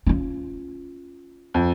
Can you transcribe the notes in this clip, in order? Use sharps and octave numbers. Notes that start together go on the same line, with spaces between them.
C#4 F4
F2